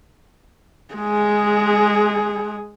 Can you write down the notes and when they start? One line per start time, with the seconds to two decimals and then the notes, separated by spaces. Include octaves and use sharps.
0.95 G#3 G#4